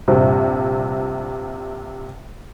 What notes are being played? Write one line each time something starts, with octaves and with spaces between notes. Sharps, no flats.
A#1 G2 C3